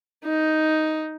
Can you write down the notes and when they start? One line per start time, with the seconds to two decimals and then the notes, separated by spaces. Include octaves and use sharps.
0.25 D#4